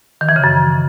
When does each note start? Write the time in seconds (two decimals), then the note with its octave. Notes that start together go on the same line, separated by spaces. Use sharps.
0.21 D#3
0.29 E3
0.36 C#3
0.44 F#2